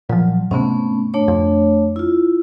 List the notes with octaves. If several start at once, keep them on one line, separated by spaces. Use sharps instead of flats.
A#2 F3 F#3
G#2 C3 A3 B3 C#4
A3 D4 C#5
F2
E4 F4